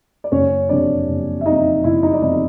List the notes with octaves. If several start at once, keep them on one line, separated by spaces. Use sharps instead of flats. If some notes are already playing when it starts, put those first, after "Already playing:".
D5
F#1 C#4 C#5
F2 C3 D4 D5
F#1
E5
F2 C3 D#4 D#5
F#1 E4 E5
D#4 D#5
D5
F2 C3 D#4 D#5